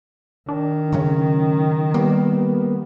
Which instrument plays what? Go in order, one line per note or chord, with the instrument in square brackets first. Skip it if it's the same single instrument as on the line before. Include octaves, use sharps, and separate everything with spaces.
[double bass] D#3 [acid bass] D4
[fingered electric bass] A2 F#3 C#4 [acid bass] C#3
[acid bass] G3 [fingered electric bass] A#3 [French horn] B3